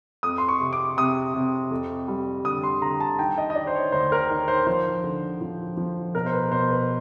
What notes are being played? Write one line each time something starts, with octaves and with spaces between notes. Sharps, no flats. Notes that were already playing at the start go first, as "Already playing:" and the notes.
F2 D#6
C6
C#6
C3
D6
C3 D#6
C3
F2
G3
D3 D#6
C6
D3 A#5
A5
D#3 G5
D#5
D#5
D#3 D5
C5
C#5
D2 C5
A#4
D#3
C5
F3 C5
D3
F3
F3
B2 A#4
C5
B4
B2 C5
B4